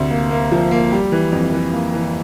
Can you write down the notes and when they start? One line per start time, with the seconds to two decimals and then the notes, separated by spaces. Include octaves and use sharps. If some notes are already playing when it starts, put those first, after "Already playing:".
Already playing: D2 C3
0.11 A#3
0.31 A#3
0.52 F3
0.71 A#3
0.92 G3
1.12 E3
1.32 F2
1.53 E3
1.73 A#3
1.94 E3